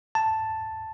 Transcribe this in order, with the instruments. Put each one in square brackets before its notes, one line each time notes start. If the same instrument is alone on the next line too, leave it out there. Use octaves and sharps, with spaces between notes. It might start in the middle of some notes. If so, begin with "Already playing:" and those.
[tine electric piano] A5